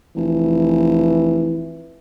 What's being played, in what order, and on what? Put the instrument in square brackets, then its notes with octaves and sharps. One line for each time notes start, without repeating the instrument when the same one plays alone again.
[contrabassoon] F1 [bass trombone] E3